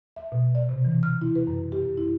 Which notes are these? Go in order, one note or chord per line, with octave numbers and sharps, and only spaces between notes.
E5
B2
D5
C3
E3
F6
E4
B4
F#2
G4
F#2
E4